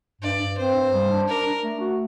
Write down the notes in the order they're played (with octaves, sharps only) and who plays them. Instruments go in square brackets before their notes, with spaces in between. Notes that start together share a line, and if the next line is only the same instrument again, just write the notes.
[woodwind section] G2 [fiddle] D5
[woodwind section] G2
[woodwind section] C4 [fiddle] C5
[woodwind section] G2
G3
D4
[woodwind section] D4 [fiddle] A#4
[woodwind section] D4
A3
F#4